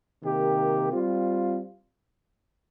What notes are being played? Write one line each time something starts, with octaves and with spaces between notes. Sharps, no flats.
C3 D#3 A#3 G4
G3 C4 F4